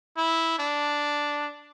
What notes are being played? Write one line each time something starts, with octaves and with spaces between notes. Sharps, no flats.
E4
D4